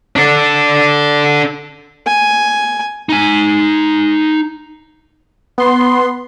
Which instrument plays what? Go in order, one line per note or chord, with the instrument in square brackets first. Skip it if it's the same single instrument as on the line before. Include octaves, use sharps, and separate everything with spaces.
[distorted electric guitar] D4 A4
[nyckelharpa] G#5
[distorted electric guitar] D#4 G#5
[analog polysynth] B3 C6